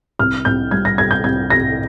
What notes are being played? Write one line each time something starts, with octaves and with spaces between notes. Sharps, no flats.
C2 F6
C2 G6
G3 G#6
A#6
C3 G#6
G6
C2 G#6
C2 A#6